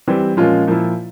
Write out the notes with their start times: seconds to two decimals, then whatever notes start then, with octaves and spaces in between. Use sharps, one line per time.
0.08 E3 G3 C4
0.37 A#2 F3 G#3 C#4 F4
0.67 A#2 F3 A#3 E4